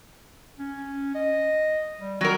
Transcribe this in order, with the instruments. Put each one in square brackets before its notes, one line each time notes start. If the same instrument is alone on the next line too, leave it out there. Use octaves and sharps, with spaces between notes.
[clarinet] C#4
D#5
G3
[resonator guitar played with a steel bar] F#3 A#4 [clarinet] C4